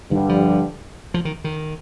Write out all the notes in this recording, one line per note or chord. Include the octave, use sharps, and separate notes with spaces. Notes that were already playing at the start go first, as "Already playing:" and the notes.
G2 D3 D#3 G3
F3
F3
D#3
D#3